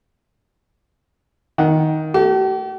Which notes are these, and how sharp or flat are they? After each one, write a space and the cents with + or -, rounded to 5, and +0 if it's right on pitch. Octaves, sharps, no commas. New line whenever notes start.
D#3 +10 F#5 +0
A3 +0 G4 -45